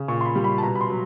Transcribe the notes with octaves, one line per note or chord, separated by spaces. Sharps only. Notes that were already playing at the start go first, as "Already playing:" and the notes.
Already playing: C#3
A#2 C#6
C6
B5
G3
B5
A5
B2 A#5
B5
C6
F#3